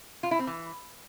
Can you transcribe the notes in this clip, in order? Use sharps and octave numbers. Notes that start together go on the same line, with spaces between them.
F4
E4
C4
E3